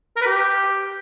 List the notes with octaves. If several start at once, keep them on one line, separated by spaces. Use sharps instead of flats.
A#4
B4
G4